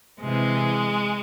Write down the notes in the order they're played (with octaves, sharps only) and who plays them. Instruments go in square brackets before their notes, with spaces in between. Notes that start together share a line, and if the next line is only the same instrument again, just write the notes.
[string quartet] C3 E3 G#3